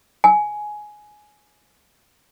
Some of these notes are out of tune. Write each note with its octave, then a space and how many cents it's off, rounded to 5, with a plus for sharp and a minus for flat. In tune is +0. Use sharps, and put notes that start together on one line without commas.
G#5 +10